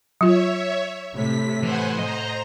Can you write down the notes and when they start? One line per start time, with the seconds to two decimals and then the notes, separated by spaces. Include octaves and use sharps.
0.21 F#3 F4 C#5 E5
1.13 A2 C3 B6
1.63 E3 C5 F#5 G#5
1.99 C5 D#5 A#5